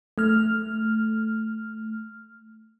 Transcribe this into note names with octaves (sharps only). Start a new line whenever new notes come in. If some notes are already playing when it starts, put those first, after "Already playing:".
A3 F6